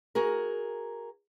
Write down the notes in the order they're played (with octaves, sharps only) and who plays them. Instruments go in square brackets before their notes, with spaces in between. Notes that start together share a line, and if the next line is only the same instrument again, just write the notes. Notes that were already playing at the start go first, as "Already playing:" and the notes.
[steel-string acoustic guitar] F#4 G#4 A#4